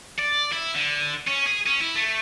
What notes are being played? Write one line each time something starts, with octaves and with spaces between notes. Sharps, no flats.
D5
E4
D3
C#4
G#4
C#4
E4
A3